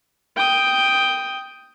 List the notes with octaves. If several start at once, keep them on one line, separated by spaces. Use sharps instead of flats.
G5 D#6